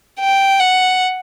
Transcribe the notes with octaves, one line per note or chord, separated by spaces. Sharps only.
G5
F#5